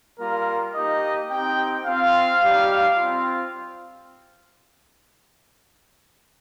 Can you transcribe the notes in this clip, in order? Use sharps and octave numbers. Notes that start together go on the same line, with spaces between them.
G3 A#3 F4 A#4
A#3 D#4 G4 D#5
C4 D#4 G4 G5
C4 F4 F5
G3 D#4 G4
C4 F4